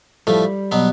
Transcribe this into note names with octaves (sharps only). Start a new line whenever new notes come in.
A2 F3 G3 A3
B2 F#3 B3